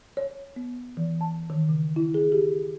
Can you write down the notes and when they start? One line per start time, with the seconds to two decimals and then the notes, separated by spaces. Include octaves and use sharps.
0.17 C#5
0.56 B3
0.97 E3
1.21 A5
1.50 D#3
1.69 C#3
1.96 E4
2.14 G#4
2.32 G4